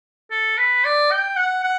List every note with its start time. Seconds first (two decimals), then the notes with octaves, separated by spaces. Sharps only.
0.31 A4
0.58 B4
0.84 D5
1.11 G5
1.36 F#5
1.63 F#5